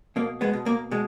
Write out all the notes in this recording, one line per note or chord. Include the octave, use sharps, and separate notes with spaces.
B2 A#3
G#3 B3
B2
A#3
B2 G#3